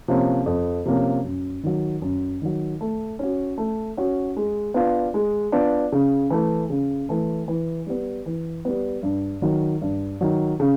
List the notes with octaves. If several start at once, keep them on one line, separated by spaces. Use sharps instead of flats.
C3 F3 A#3 C#4
F2
C3 F3 A#3 C#4
F#2
D#3 F#3
F#2
D#3 F#3
A3
C#4 F#4
A3
C#4 F#4
G#3
B3 D4 F4
G#3
B3 D4 F4
C#3
E3 A3
C#3
E3 A3
E3
G3 B3
E3
G3 B3
G2
D#3 F#3
G2
D#3 F#3
C#3